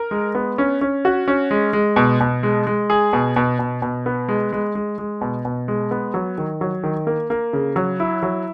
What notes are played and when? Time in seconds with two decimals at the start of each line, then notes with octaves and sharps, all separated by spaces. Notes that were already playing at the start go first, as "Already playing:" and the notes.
Already playing: A#4
0.11 G#3
0.35 B3
0.58 C#4
0.81 C#4
1.05 F#4
1.28 C#4
1.51 G#3
1.73 G#3
1.96 B2
2.20 B2
2.43 G#3
2.67 G#3
2.90 G#4
3.13 B2
3.36 B2
3.59 B2
3.82 B2
4.06 B3
4.28 G#3
4.52 G#3
4.75 G#3
4.98 G#3
5.21 B2
5.45 B2
5.68 G#3
5.91 B3
6.14 F#3
6.38 D#3
6.61 F#3
6.83 D#3
7.07 A#3
7.30 A#3
7.53 C#3
7.76 F#3
8.00 E4
8.23 F#3